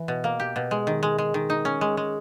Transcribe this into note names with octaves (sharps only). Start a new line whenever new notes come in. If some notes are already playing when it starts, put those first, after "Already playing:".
Already playing: E3
B2
A#3
G4
B2
G#3
D#3
G#3
G#3
D#3
D#4
C#4
G#3
G#3